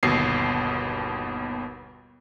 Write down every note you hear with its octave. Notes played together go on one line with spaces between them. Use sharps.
G1 D#2 B2 C7